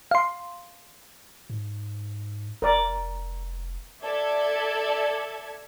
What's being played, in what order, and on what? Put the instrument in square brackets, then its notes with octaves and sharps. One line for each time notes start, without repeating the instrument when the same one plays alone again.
[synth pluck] F5 C6
[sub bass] G#2
[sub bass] F1 [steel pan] A#4 D5
[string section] A4 D5 E5 G#6